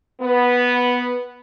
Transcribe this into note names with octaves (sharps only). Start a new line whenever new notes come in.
B3